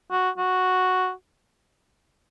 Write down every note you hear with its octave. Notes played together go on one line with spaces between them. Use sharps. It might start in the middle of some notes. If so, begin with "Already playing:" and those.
F#4
F#4